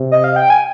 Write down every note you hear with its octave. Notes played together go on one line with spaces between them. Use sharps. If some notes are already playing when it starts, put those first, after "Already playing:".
Already playing: C3
D#5
F5
G5
G#5